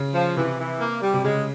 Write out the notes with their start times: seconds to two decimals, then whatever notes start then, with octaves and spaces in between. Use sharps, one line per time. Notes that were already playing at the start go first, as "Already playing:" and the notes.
Already playing: C#3
0.14 F3
0.37 C3 E3
0.59 E3
0.80 A#3
1.02 G3
1.14 C3
1.24 C#3 G#3